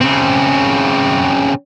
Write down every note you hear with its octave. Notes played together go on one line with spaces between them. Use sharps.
C#3 C4